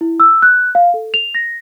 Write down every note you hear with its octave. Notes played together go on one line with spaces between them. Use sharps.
E4
E6
F#6
F5
A4
F7
A#6